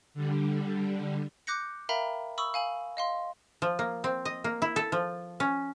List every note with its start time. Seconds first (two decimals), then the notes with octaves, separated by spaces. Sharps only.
0.14 D3 G3
1.47 D6 F#6 G6 A#6 C#7
1.89 A#4 E5 F5 G5 A#5 B5
2.38 B5 C#6 D#6 E6
2.54 F5 G#5 F#7
2.97 D#5 F5 C6
3.62 F3
3.79 A#3
4.04 C4
4.25 D#5
4.44 A#3
4.62 E4
4.76 A4
4.92 F3
5.40 C#4